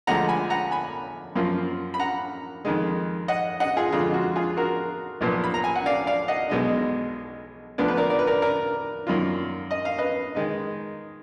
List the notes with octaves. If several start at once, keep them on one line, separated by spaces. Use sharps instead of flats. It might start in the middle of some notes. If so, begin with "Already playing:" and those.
D2 D3 F3 G#3 F#5 A#5
G#5 B5
F#5 A#5
G#5 B5
F#2 F3 A#3 F4
B5
F#5 A#5
F2 D#3 G#3
D#5 F#5
D#5 F#5
F4 G#4
F2 D3 G#3 F4
F#4
F4 G#4
F#4 A#4
B1 A#2 F3 B3
B5
A#5
G#5
F#5
D5 F5
D5 F5
D#5 F#5
B1 B2 G#3 D#4
D2 D3 F3 B3 D4 D5
B4
A#4 D5
D5
B4
A#4 D5
A#4 D5
F#2 D#3 A#3 F4
D#5
F5
B4 D#5
D#3 G#3 D#4